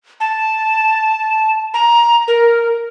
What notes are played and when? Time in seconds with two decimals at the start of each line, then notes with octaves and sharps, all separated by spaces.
0.20 A5
1.74 A#5
2.28 A#4